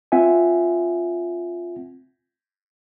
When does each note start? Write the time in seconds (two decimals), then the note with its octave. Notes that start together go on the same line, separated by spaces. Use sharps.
0.12 C4 F4 E5 F#5 G#5